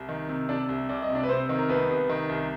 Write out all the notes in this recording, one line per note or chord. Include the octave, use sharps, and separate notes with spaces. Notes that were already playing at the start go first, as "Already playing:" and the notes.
Already playing: C2
D#3
C3
C3 D4 D5
C2
C2 D5
D#5
C3
D4 D5
B4
C3 C4 C5
D#3
A#4
C2 B3 B4
C2
D#3
C2